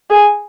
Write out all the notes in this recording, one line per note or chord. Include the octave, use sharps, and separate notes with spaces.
G#4